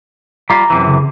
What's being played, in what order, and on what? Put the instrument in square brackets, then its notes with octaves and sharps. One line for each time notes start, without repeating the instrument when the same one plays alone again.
[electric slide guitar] G3 F4 [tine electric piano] A#5
[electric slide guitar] F#2 C3 E3
[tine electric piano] C#3